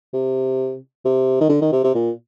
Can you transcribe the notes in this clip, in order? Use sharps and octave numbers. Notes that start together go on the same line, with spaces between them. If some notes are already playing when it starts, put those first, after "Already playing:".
C3
C3
D#3
D3
D#3
C3
C3
A#2